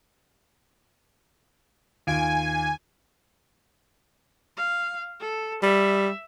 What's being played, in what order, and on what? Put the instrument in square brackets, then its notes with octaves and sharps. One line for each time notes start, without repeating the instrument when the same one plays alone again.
[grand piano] D#2 F4 D7 [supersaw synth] G#5
[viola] F5
A4
[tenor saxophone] G3 [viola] E5